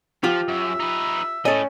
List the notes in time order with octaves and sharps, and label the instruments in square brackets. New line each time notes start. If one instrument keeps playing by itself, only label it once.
[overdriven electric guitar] F3 [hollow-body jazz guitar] F4 G4
[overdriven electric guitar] F#2 [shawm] E5
[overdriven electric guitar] D#4 B4
[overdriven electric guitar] A2 [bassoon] C#4 [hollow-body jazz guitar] A4 D#5